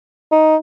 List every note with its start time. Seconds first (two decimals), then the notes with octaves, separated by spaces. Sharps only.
0.32 D#4